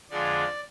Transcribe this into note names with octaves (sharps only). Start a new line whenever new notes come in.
F2 D3 G#3 D4 F4 D5